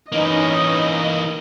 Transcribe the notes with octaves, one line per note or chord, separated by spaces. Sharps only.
E3 A#3 C#4 D#4 B4 D#5